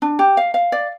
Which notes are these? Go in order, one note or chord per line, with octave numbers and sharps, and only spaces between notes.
D4
G4
F5
F5
D5